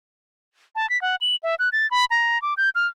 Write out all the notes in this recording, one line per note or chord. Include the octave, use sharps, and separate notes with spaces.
A5
B6
F#5
F#7
E5
F#6
A6
B5
A#5
D6
G6
F6